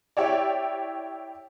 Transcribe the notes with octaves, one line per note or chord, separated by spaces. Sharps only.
E4 G4 C#5 D5